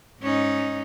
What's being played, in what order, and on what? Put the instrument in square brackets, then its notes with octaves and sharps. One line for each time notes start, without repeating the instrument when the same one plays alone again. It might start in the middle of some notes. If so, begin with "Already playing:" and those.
[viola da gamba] G#2 C#4 D#4